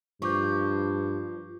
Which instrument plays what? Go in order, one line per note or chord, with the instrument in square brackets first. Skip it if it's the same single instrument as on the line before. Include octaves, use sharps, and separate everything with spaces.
[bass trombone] G2 [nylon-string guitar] F3 [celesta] C#6 D6 G6